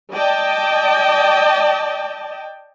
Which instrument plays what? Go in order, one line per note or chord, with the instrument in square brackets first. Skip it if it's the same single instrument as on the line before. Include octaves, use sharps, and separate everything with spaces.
[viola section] D5 D#5 G5 A5